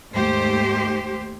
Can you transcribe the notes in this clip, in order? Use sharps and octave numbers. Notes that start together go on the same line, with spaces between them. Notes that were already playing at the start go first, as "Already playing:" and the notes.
D#2 G#2 A3 G4 C5